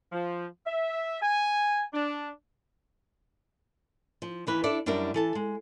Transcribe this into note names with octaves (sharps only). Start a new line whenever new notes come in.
F3
E5
G#5
D4
F3
D#2 E3 B4
D4 E4 A4 D5
F#2 G3 D4 E4 A#4
E3 A4 A5
G#3